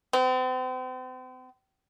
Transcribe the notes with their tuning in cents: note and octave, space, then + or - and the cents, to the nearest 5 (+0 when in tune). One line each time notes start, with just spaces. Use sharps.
C4 -40